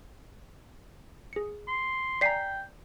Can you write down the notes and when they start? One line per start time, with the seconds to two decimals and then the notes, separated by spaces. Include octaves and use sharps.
1.33 G#4 C#7
1.68 C6
2.21 D5 G5 G#5 A#5 B6 C7